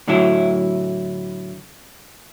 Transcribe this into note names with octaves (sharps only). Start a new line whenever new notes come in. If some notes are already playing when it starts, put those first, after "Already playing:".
A2 D3 F#3 E4